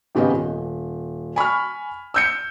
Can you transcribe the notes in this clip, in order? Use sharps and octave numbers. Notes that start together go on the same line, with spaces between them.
G#1 C#3 B3 G4 D#5
D#1
G#5 B5 C#6 F6
E6 G6 C#7